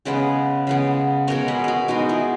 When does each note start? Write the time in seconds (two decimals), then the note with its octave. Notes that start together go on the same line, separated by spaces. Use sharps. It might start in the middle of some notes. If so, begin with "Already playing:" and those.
0.05 C#3 G#3 B3 G#4 B4
0.67 C#3 G#3 B3
1.27 B2 G#3 B3 A#4 C#5
1.48 G#4 B4
1.64 F#4 A#4 B4
1.88 B2 G#3 B3 D#4 F#4
2.09 E4 G#4